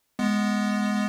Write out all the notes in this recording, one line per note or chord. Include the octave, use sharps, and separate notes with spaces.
G#3 B3